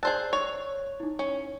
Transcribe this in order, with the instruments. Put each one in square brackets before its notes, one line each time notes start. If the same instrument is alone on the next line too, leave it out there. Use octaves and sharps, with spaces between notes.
[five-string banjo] G#4 C5 A5 [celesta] D5 E6 F#6
[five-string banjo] C#5
[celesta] D#4 E4
[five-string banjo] C#4